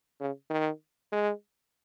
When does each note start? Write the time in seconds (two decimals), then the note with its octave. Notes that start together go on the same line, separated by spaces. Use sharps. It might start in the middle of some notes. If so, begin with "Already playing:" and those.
0.21 C#3
0.50 D#3
1.12 G#3